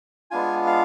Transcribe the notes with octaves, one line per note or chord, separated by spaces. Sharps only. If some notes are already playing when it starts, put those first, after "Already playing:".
G#3 B3 D4 F4 G#5
F5